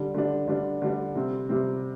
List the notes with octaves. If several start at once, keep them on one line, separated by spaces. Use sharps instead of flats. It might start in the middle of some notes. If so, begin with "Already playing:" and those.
Already playing: D3 G3 D4
D3 G3 D4
D3 G3 D4
D3 G3 D4
C3 G3 C4
C3 G3 C4